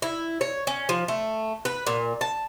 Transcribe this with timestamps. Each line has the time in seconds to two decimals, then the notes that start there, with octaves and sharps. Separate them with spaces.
0.02 E4
0.41 C#5
0.67 C#4
0.89 F3
1.08 A3
1.65 B4
1.87 A#2
2.21 A5